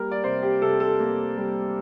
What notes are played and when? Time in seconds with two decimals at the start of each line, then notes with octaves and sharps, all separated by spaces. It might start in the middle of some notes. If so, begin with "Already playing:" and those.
Already playing: G3 A#3 A#4
0.12 D5
0.24 C3 C5
0.43 G4
0.62 C3 A4
0.80 A4
1.00 A#3
1.37 G3